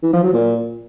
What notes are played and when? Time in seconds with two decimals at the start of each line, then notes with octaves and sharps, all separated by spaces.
0.03 E3
0.13 F3
0.23 F#3
0.33 A#2